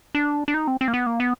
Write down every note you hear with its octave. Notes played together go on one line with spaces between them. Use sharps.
D4
D4
D#4
C4
C4
A#3
B3
A#3
B3